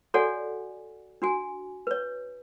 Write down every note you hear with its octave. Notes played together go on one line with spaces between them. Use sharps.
F#4 A4 C#5 D5 F#5 G#5
D4 F#4 G#5
B4 C#5